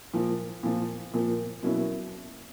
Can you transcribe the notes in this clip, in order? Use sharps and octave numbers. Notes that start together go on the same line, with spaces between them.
A#2 F3 A#3
A#2 F3 A#3
A#2 F3 A#3
B2 F#3 A#3 C#4 E4